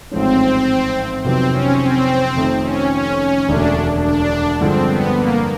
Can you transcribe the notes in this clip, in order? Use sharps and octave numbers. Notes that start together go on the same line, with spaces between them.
A1 G#2 F3 G#3 C4 C#4
F2 C3 D#3 F#3 B3 C4
C#4
C4
F1 F2 C3 D#3
C#4
C#4
C#4
E1 D2 D3 D4
D4
G2 D3 F3 G#3 C4
B3
A#3